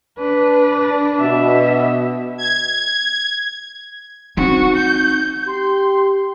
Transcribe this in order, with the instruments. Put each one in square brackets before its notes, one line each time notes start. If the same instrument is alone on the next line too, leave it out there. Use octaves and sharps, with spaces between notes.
[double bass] D4 [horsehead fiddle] B4
[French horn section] B2 [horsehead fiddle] E5
[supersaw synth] G#6
[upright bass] C4 D#4 [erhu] F#4
[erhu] G6
[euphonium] G4 [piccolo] C6